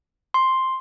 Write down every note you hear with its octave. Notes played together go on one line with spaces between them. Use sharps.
C6